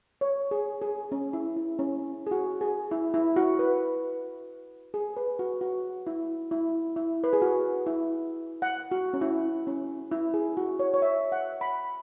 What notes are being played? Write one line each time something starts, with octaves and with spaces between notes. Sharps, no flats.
C#5
G#4
G#4
C#4
E4
E4
C#4
G#4
F#4
G#4
E4
E4
F#4
B4
G#4
B4
F#4
F#4
E4
E4
E4
B4
G#4
F#4
E4
F#5
F#4
C#4
E4
C#4
E4
G#4
F#4
C#5
C#5
E5
F#5
B5